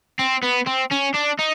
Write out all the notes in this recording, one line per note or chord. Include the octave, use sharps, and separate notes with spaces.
C4
B3
C4
C#4
D4
D#4